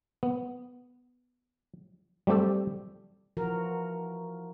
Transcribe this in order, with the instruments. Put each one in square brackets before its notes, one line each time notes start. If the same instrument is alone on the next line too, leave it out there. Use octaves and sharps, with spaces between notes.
[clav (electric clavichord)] B3
G3 A3 C4 G4 A4
[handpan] E3 F3 F#4 A#4